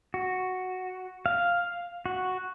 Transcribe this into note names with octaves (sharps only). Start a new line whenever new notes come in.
F#4
F5
F#4